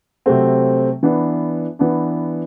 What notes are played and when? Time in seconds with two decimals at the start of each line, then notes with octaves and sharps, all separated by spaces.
0.26 C3 F#3 A3 C4
1.03 E3 B3 D4
1.79 E3 B3 D4